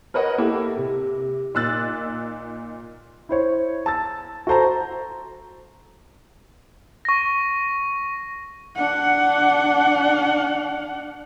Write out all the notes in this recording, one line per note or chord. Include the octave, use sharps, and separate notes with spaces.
A#4 B4 C#5 D#5 F#5
A#3 E4 G4 A4
C3
A#2 D#4 E6 F#6 A6
E4 C5 C#5
A5 E6 A6
F#4 A4 C5 A5 A#5
C#6 A#6
D4 F#5